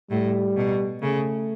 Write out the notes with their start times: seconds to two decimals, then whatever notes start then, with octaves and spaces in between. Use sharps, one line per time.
0.10 A2 G3
0.57 B2
1.02 C#3 A3